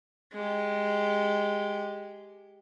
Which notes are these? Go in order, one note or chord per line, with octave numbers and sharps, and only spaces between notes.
G#3 G4